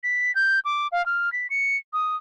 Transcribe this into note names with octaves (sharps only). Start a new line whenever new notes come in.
B6
G6
D6
F5
F6
B6
C#7
D#6